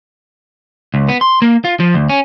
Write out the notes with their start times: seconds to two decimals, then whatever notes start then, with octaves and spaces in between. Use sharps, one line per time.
0.94 C#2
1.09 B3
1.21 C6
1.42 A#3
1.65 F4
1.80 F3
1.94 D2
2.09 C#4